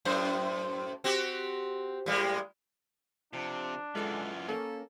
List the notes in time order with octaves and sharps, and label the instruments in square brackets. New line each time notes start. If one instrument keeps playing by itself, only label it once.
[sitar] F#2 A2 C5
C4 F#4 G4
A2 G3 G#3
[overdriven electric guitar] C3 [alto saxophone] F3 [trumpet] D4
[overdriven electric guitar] F#2 E3 [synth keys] G#3 A4 [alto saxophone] F4
[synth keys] A#3 C#4 [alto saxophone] A4